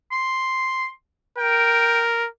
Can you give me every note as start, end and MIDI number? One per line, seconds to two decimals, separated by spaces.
0.12 0.88 84
1.38 2.28 70
1.38 2.03 79